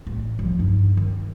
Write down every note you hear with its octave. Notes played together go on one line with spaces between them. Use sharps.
A1
E2 F3
G2 D#4
D#3